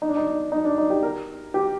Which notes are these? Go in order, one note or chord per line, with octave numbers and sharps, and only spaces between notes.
D#4
D4
D#4
D#4
D4
D#4
G4
A#4
G4